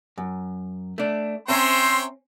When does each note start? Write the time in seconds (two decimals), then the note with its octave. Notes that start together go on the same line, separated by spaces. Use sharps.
0.18 F#2
0.98 A3 D4
1.48 C4 C#4 C5 C#5 E5 G5 A#5 C6